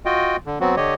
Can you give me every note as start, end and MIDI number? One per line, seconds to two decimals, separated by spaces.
0.05 0.37 65
0.05 0.37 66
0.05 0.37 75
0.05 0.37 79
0.46 0.59 50
0.60 0.76 54
0.60 0.76 59
0.60 0.76 60
0.60 0.76 66
0.77 0.94 50
0.77 0.94 67
0.77 0.94 73
0.77 0.94 75